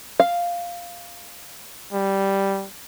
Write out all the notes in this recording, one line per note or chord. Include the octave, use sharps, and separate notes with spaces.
F5
G3